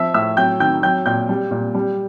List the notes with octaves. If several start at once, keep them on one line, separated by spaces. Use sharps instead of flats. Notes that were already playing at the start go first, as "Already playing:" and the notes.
Already playing: F3 E5 E6
A2 E5 E6
F#3 G5 G6
D#3 G5 G6
F#3 G5 G6
A#2 G5 G6
G3
A#2
G3